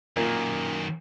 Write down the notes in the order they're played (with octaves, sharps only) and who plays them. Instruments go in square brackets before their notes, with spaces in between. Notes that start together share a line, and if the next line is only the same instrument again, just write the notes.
[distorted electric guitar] F#2 D#3 [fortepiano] A#2 A#3